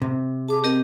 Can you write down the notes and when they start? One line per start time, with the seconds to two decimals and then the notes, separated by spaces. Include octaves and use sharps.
0.02 C3
0.48 G#4 A5 D6
0.64 C4 G4 A#4 D#5